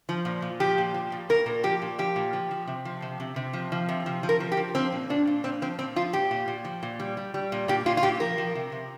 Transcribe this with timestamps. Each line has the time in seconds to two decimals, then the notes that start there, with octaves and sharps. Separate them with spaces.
0.09 F3
0.25 A#2
0.42 A#2
0.60 F3 G4
0.78 A#2
0.94 F3
1.12 A#2
1.29 A#2 A#4
1.46 A#2
1.63 F3 G4
1.82 A#2
1.99 F3 G4
2.16 A#2
2.33 F3
2.51 F3
2.67 C3
2.85 F3
3.02 C3
3.20 C3
3.36 C3
3.53 F3
3.72 F3
3.89 C3
4.06 F3
4.23 F3
4.29 A#4
4.40 F3
4.52 G4
4.57 F3
4.75 F3 C4
4.92 A#2
5.10 A#2 D4
5.27 A#2
5.44 A#2 C4
5.62 F3 C4
5.79 A#2 C4
5.96 F3 F4
6.13 A#2 G4
6.31 A#2
6.48 A#2
6.65 F3
6.83 A#2
7.00 G3
7.17 G3
7.34 G3
7.52 A#2
7.68 A#2 G4
7.86 A#2 F4
7.97 F4
8.03 A#2 G4
8.20 F3 A#4
8.38 F3
8.55 C3
8.72 C3